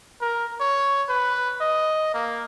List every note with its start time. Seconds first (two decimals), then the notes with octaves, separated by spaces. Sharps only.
0.21 A#4
0.60 C#5
1.09 B4
1.60 D#5
2.14 A#3